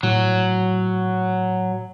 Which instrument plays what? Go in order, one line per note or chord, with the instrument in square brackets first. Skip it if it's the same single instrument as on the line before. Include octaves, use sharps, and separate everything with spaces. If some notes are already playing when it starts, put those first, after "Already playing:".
[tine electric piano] A2 [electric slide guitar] F#3